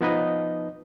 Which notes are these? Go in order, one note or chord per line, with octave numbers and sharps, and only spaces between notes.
F3 B3 D#4 B4 D#5